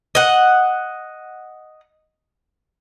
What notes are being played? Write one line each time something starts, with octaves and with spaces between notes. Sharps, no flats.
D#5 F#5